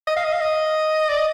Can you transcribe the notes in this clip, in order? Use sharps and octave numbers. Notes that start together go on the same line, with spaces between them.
D#5
F5
D#5
F5
D#5
D5
D#5